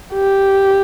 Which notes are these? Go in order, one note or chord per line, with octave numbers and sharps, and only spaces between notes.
G4